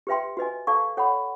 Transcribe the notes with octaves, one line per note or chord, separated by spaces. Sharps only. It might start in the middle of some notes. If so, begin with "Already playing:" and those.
G4 B4 E5 G5 C6
F#4 B4 D#5 G#5
A4 D5 F5 A5 C#6
A4 C#5 F#5 B5